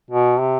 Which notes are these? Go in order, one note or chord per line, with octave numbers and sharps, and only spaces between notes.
B2
C3